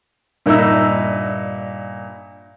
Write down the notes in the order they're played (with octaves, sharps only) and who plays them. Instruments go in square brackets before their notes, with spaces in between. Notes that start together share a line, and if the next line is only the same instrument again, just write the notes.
[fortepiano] G2 A#2 A#3 D#4 E5 E6